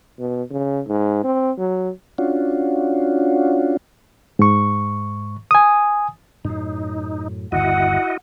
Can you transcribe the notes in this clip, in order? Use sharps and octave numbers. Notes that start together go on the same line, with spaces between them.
B2
C#3
G#2
C4
F#3
C#4 D4 F4 F#4
G#2 C#6
G#5 D#6
F#2 A2 D#4
G1 D#2 E4 F#4 D#5 F#5